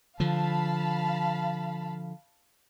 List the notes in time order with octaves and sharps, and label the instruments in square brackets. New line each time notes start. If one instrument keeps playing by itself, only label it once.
[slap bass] D3 F3 [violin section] F5 A5 B5